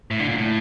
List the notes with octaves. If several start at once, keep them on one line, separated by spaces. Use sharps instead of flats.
A2
D3
A#2
A2